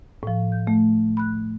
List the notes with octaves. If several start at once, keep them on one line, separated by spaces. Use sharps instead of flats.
A2 F3
G6
A3
B5 F#6